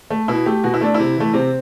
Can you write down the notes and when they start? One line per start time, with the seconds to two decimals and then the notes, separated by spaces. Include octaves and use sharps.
0.10 A3
0.28 B2 E4
0.46 A3 G4
0.64 B2 F#4
0.74 E4
0.81 A3 D4
0.94 C3 E4
1.16 E3 A3
1.33 C3 C4